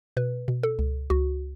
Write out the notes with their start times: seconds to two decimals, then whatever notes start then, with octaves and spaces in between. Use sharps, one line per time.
0.17 B2 B4
0.48 B2
0.63 A4
0.79 C#2
1.10 C#2 F#4